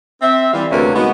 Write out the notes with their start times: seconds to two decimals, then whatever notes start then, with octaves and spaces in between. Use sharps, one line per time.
0.22 C4 E5
0.53 E3 G3 F5
0.71 D2 C3 A#3 C#4 F#4 B4
0.94 G#3 B3 D#4 F#4